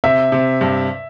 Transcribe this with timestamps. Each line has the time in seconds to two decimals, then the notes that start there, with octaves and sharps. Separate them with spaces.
0.04 C3 E5
0.32 C3
0.61 G2